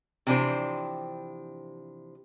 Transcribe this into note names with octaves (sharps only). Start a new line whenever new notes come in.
C3 E3 F3 D4 G4 C5